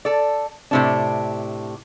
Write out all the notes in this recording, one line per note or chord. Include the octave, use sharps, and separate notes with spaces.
A4 D5
A2 C3 D4